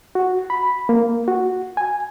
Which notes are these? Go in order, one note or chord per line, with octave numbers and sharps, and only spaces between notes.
F#4
B5
A#3
F#4
G#5